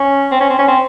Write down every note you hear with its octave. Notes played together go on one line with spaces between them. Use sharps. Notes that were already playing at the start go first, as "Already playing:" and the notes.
Already playing: C#4
C4
C#4
C4
C#4
C4